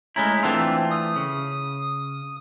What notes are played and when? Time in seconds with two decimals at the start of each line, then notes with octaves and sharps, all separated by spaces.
0.16 G#3 A3 C#4 E4 A#5
0.43 E3 A3 C4 D4 F4 E6
0.91 D#6
1.16 C#3